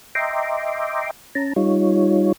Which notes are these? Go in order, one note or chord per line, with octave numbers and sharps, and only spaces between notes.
D#5 E5 G5 A#5 C6 D6
C#4 A5 A#5
G3 D#4 F4 C#5